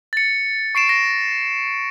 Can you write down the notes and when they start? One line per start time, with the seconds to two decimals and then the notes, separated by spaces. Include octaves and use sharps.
0.13 A6 C#7
0.75 C#6 C7 D7 E7
0.89 A#6